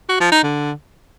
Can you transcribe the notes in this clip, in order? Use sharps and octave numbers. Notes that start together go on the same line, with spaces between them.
F#4
F3
D#4
D3